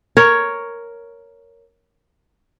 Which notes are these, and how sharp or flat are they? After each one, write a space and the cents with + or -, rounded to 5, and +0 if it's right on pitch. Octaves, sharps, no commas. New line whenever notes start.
A#4 +0 C#5 +5